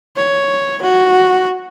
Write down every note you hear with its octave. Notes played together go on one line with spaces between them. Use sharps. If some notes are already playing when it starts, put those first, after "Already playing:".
C#5
F#4